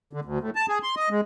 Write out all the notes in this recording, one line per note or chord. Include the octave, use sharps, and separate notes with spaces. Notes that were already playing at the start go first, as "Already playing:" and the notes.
D3
D2
A2
A5
G#4
C6
D#5
G#3